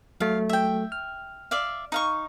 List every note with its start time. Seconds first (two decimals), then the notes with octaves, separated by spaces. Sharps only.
0.20 F#3 A3 F5
0.49 E5 G5
0.92 F6
1.51 D5 E5 F5
1.92 D#4 F5 C#6